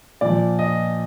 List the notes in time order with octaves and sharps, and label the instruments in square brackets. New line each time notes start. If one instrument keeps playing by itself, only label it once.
[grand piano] A#2 F3 D5
D#5